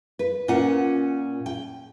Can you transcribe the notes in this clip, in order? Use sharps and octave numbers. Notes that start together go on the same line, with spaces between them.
B4
A#2 C#4 F4 F#5
G5